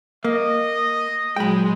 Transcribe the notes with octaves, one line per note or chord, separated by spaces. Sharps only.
A#3 D#5
A#2 F#3 G#3 G5 B5